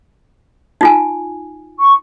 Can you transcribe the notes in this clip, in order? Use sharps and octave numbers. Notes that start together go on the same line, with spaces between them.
D#4 F4 G#5
C#6